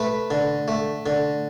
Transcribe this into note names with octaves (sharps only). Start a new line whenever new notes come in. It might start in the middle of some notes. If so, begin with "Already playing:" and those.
Already playing: A3 B4
D3
A3
D3